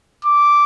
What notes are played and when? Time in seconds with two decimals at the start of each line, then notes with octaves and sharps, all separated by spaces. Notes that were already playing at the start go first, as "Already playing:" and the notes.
0.25 D6